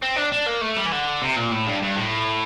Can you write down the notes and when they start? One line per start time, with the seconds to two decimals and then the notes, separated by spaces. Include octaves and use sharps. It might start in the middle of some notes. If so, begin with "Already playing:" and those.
0.02 C4
0.16 D4
0.32 D4
0.46 A#3
0.61 A3
0.76 G3
0.86 E3
0.92 D3
1.22 C3
1.36 A#2
1.51 A2
1.66 G2
1.82 G2
1.96 A2